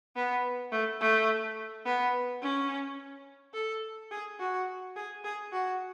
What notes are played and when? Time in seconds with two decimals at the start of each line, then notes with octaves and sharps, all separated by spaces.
0.16 B3
0.72 A3
1.01 A3
1.85 B3
2.42 C#4
3.54 A4
4.11 G#4
4.40 F#4
4.96 G#4
5.24 G#4
5.52 F#4